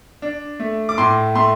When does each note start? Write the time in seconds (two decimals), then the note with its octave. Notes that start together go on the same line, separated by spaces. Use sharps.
0.22 D4
0.60 A3
0.89 D6
0.98 A2 C6
1.35 A3 C6